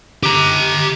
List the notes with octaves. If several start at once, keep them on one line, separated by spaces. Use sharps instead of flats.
G4 A#5